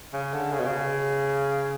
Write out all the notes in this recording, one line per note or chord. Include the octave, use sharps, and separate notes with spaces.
C#3
D3
C#3
B2
C#3